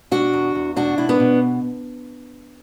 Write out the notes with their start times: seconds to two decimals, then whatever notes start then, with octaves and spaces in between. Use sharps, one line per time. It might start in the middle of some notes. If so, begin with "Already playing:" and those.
0.11 B2 D4 F#4
0.33 E2
0.55 E2
0.76 B2 D4 F#4
0.98 B2 E4
1.09 B3 D4
1.20 B2